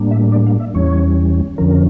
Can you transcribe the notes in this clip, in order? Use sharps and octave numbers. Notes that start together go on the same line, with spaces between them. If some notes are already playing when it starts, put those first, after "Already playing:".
Already playing: A2 G3 A#3 D4
E5
D5
F5
E5
E2 E3 G3 C#4 C#5
F2 D3 F3 C#4 A#4